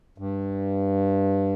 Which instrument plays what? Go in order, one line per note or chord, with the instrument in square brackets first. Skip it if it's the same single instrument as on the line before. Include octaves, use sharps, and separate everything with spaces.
[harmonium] G2